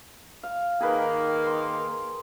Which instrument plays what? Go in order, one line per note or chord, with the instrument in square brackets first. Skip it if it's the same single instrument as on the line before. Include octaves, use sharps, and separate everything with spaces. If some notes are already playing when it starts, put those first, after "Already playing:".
[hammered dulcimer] F5
[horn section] D#3 A#3 [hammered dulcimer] G#4 A#4 B4
[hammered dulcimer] C6